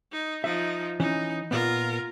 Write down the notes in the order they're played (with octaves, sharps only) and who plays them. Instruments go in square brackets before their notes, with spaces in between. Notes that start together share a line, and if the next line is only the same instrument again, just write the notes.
[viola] D#4
[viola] F3 D#4 [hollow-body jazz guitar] E5
[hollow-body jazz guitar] E3 C#4 [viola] D#4
[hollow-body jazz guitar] A#2 B3 [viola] F4 A#4